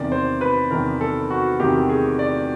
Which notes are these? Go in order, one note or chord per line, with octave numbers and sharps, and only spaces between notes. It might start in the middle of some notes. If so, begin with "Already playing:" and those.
Already playing: E2 C3 D#3 D5
C5
B4
E2 C3 D#3 A#4
A4
F#4
E2 C3 D#3 G4
G#4
D5